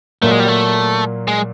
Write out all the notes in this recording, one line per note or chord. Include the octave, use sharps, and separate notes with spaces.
A#2 F#3 A3 A#3
G#3
G3
A3
G#3